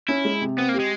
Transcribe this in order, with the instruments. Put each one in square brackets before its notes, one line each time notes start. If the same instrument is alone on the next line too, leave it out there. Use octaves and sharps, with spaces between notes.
[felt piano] C#4 [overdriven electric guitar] E4
[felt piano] G#3
C3
[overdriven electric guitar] B3 [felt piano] C4
[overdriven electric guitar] A#3
[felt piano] G4
[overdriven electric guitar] G#3